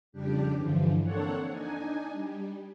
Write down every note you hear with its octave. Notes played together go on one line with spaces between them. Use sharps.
F2 C#3 G3 D4 G4
G2 D3 E3 F3
A#3 C4 D4 A4 C#5 F#5
D4 D#4 G#5
G3